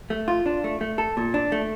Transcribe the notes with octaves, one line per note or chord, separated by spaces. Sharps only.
A3
F4
D4
A3
A3
A4
A#2
D4
A3